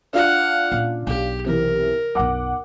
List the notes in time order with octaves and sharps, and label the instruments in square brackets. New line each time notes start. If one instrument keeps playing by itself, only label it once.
[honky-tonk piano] D4 F4 [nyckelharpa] F5 F#5
[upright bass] A#2 C#4
[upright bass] B1 [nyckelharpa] G4
[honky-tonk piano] C3 E3 [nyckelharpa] A#4
[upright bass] B1 F#2 [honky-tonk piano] F#5 D6